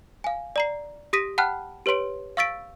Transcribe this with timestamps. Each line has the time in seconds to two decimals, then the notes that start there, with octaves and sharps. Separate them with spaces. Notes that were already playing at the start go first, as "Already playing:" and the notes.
0.24 F5 G#5
0.56 D5 A#5 C7
1.13 G4 D#6 A#6 B6 D#7
1.38 F#5 G5 A5 B5 F6 F#6
1.86 G4 B4 C#5 C6 D7
2.37 F5 C#6 E6 A6 B6 D7